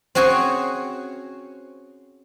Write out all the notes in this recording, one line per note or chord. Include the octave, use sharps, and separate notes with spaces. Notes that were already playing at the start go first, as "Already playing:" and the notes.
C4 C#4 F#4 G#4 C5 C#5